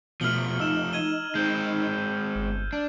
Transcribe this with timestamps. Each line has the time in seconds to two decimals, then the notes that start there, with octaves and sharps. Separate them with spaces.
0.21 B2 F3 A3 F6 F#7 G7
0.60 D#4 E6 E7
0.93 G#6 D#7 G7
1.35 G#3 C4 G6
2.35 G1
2.73 D4